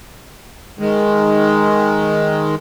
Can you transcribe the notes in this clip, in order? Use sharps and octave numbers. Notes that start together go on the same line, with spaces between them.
D#3 G#3